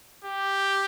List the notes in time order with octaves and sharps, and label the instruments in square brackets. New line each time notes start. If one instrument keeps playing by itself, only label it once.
[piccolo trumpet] G4